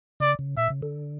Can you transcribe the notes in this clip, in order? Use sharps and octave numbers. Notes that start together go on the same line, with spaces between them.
C#3 D5
C#3
A#2 E5
C#3
D3